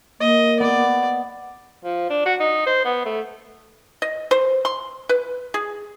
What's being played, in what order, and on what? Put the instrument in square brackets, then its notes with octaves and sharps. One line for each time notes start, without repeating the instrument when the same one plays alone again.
[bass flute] A#3 [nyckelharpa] D#5
[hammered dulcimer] B3 [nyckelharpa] D5
[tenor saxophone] F3
D4
F#4
D#4
C5
B3
A3
[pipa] D#5
C5
C6
B4
G#4